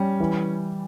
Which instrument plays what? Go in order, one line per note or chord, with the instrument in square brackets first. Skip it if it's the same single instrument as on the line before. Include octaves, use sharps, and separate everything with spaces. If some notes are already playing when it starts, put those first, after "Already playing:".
Already playing: [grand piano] G3 [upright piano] C#4
[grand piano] E3